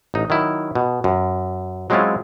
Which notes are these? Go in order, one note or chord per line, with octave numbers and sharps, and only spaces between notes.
A1 D#4
D#3 F#3 E4
B2
F#2
F#3 G#3 C4 C#4 E4 F4